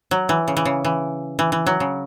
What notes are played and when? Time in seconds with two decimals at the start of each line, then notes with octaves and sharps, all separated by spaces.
0.11 F#3
0.29 E3
0.48 C#3
0.57 E3
0.65 C#3
0.85 E3
1.39 E3
1.52 E3
1.67 F#3
1.80 C#3